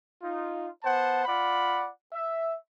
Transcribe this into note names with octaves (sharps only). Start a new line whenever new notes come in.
D#4 F4
B3 C5 F#5 A5
F4 D5 F#5 B5
E5